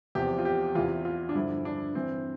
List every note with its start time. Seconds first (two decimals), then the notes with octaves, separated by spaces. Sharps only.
0.15 E2 C3 F3 G4
0.38 F4
0.45 G4
0.75 E2 C3 E3 F4
1.05 F4
1.29 D4
1.35 G2 D3 F3 E4
1.65 D4
1.95 G2 E3 C4